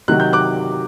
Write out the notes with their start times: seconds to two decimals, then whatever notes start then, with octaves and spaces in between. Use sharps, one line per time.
0.08 C3 D#3 F#3 F#6
0.20 G6
0.33 D6 F#6